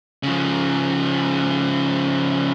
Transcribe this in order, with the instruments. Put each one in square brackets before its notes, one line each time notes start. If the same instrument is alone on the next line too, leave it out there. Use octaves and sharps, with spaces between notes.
[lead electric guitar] C#3 F3